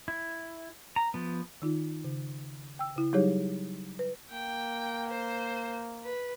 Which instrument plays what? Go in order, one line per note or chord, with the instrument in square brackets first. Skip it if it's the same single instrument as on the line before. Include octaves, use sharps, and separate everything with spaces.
[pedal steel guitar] E4
A#5
F3 B3
[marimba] D#3 D#4 F4
C#3
G5 E6
C#3 E4
F#3 G3 D#4 G4 G#4 C#5
B4
[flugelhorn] A#3 [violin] G5
[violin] C5
B4